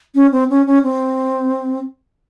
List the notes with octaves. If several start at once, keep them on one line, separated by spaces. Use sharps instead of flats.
C#4
C4
C#4
C#4
C4